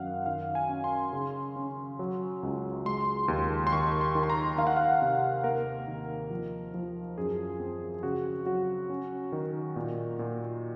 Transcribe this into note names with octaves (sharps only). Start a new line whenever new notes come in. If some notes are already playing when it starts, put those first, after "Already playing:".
Already playing: F#2 D#3 F5 F#5
D#3 F5
G#5
C#4
C6
C#3
C#4
F#3
C#2
G#3 C6
D#2
C6
D#3 C#6
C6
D#3
C6
A#5
D#3 F5
F#5
F5
C3
A#3 A#4
D#3
F3
F3
F#2 G#4
C4
C#3 F#4
F#3 F#4
C#4
D#3
A#2
A#2